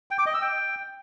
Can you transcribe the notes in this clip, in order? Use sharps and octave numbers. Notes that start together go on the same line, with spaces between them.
G5
D6
D#5
E6
G5